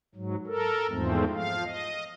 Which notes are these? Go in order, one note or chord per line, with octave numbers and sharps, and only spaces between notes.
G#2 F#3
A4 A#4
E2 G#2 F3 G#3 A3 C4
F3 F5
D#5